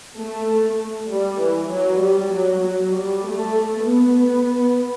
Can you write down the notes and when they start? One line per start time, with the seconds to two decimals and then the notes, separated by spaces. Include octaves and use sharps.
0.17 A3
1.11 G3
1.41 E3
1.73 F#3
2.03 G3
2.34 F#3
2.64 F#3
2.95 G3
3.27 A3
3.89 B3